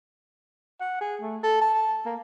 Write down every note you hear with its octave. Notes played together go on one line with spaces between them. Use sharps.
F#5
G#4
A3
A4
A5
A#3